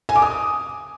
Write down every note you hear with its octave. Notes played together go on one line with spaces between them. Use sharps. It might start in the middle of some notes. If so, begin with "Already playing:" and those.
G#5
D6
D#6